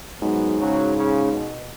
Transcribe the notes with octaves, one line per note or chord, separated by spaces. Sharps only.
G#2 F#3 B3
C#3 F#3
C#3
B2